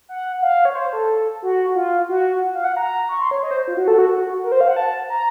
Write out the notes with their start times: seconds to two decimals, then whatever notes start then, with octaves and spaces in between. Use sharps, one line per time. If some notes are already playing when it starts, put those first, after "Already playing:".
0.09 F#5
0.42 F5
0.65 C#5
0.75 C5
0.93 A4
1.43 F#4
1.75 F4
2.09 F#4
2.54 F5
2.64 F#5
2.77 A#5
3.09 C#6
3.20 C6
3.31 C#5
3.43 D#5
3.51 C5
3.68 F4
3.77 F#4
3.88 A4
3.98 F#4
4.10 F#4
4.44 A#4
4.52 C5
4.61 F5
4.68 F#5
4.76 A5
5.10 A#5